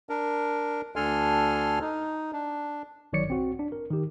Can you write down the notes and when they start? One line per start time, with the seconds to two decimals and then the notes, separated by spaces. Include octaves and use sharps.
0.09 D4 A#4
0.96 D2 D4 A4 G#5 C6 F6
1.81 D#4
2.33 D4
3.13 G1 D#3 F#3 C#5 D5 C#7
3.28 B1 C4 F#4
3.59 D4
3.72 A#4
3.91 D#3 G4